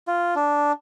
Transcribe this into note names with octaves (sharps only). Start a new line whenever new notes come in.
F4
D4